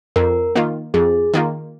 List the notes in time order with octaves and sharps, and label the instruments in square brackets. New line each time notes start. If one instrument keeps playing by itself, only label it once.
[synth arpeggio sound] F2 [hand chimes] A#4
[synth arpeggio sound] D#3 A#3 F4
[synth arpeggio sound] F2 [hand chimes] G#4
[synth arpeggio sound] D#3 A#3 F4